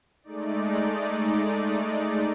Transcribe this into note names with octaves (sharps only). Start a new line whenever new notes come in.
G#3 A3 D#4 D5